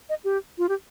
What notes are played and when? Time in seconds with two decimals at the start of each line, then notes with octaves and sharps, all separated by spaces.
0.09 D#5
0.24 G4
0.58 F4
0.69 G4